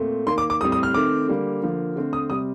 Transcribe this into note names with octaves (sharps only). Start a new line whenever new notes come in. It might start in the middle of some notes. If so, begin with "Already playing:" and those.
Already playing: A#2 A3 C4
D#3 A#3 C6
D6
D6
A2 G3 C4 D#6
D#6
F6
D#3 A3 C4 D6
D3 G3 A#3
D3 F3 A#3
D3 A3 C4
D#6
C3 G3 C4 D#6